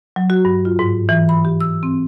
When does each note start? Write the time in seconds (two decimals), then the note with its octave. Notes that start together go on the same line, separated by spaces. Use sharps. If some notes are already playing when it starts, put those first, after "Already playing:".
0.16 F#3
0.30 F#4
0.45 G2
0.65 F4
0.79 G#2
1.09 E3
1.29 B5
1.45 G4
1.61 E6
1.83 C4